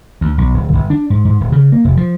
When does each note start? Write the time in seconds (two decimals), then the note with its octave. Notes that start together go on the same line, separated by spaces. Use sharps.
0.21 D2
0.38 B1
0.54 D1
0.73 G1
0.90 D4
1.10 G#2
1.25 G#2
1.41 D1
1.52 C#3
1.72 A#3
1.85 F1
1.97 F3